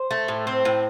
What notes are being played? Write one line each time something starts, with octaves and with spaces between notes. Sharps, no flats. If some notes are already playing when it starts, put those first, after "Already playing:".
Already playing: C5
A3
A2
C4
A2